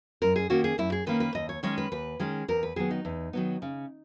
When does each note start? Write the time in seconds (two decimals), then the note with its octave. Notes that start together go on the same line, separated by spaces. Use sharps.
0.22 F#2 A#4
0.36 G#4
0.50 D#3 A#3 C#4 F#4
0.64 G#4
0.78 F#2 E4
0.92 G#4
1.06 D#3 A#3 C#4 B4
1.20 B4
1.35 D#2 D#5
1.49 C#5
1.63 D#3 G#3 C#4 C#5
1.78 B4
1.92 D#2 B4
2.20 D#3 G#3 C#4 G#4
2.48 E2 A#4
2.63 B4
2.76 D#3 F#3 B3 G#4
2.91 D#4
3.05 E2
3.33 D#3 F#3 B3
3.62 C#3